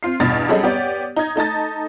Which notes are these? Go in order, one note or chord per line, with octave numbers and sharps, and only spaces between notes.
C4 F4 C7
E2 G2 B2 F6 A6
F#3 G3 C#4 G#4 A4 D#5
B3 G4 C#5 D5
D#4 G#6
A3 D#4 A5 A6